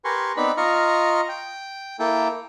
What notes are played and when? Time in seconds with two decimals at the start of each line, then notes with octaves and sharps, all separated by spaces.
0.05 G4 A#4 B4 G#5 C6 C#6
0.37 B3 C4 D#4 B4 D5 B5
0.57 F4 D#5 A#5 C#6 F6
1.29 G5
1.99 A#3 E4 A4 G5